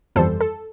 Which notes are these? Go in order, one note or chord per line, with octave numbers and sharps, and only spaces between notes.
G1 F2 E3 G3 A4 C5
A4